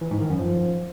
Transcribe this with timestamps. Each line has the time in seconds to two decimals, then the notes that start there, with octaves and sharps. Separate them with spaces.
0.01 E3
0.11 G#2
0.20 D#3
0.30 F#2
0.39 F3